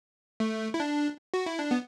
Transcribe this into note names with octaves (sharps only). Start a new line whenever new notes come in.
A3
E4
D4
F#4
E4
D4
B3